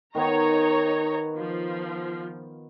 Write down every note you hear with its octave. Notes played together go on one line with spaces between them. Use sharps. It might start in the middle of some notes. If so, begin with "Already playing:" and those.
D#3 B3 D#4 C#5 A#5
F3